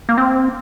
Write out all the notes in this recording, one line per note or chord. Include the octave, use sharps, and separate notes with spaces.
A#3
C4